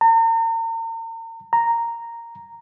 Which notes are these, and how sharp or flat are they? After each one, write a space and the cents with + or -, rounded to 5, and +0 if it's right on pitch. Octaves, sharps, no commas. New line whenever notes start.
A#5 -40
A#5 -5